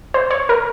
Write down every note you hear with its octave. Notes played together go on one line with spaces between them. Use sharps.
C5
C#5
A#4